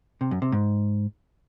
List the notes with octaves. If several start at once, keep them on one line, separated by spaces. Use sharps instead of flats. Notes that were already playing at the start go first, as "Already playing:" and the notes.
C3
F#2
C3
G#2